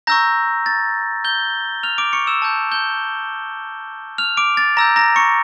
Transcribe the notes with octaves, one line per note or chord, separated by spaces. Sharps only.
A#5 C#6 E6 G6 A#6
A6
G6 G7
F6 F7
D6 D7
C#6 C#7
E6 E7
A5 D6 G6
G6 G7
F6 F7
D6 D7
A6
A#5 E6 G6 A#6
A#5 A#6
C#6 C#7